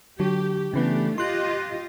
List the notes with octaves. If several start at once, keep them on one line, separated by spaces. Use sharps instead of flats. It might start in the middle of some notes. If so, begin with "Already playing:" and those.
D3 F#3 G4
C#3 E3 A3 B3 D4 G4
F4 G4 D#5 C6 F#6